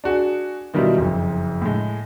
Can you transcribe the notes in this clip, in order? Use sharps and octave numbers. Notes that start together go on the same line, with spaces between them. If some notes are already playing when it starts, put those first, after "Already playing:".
D4 F#4 G#4
B2 D#3 F#3 G3 E4 F4
F#1 F2
A2 G#3